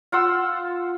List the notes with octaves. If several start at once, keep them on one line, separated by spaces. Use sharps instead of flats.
F4 F#5 C6 E6